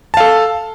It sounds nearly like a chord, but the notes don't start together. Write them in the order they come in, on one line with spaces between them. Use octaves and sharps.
A5 F5 A4